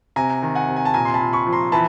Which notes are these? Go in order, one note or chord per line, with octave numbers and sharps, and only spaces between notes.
C3 G#5 A#5
D#3
F#5 G#5
C3
G#5
A5
A#2 G#5 A#5
C6
A5 B5
A#2
B5 C#6
F3
A#5 C6
E3 A5 B5